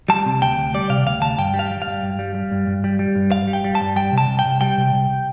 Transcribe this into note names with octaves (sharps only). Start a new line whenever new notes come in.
G3 A5
C3
D2 G5
D2
G3 D5
C3 F5
D2 F5
D2 A5
G2 G5
G3
F5
G3
F5
G2
G2
G3
G3
G2
G2
G3
G3
G2
G2 F5
G3
G5
G3
A5
G2
G3 G5
C3 A5
C2
G5
C2
G3 G5
C3
C2